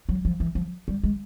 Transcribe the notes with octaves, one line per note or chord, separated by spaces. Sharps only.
F#3
F3
E3
F3
G3
G#3